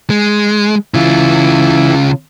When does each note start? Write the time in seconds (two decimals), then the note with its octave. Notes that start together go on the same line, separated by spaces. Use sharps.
0.10 G#3
0.94 C#3 E3 F4